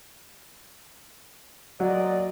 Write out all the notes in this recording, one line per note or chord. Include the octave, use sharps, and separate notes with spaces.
A#2 F#3 D5 D#5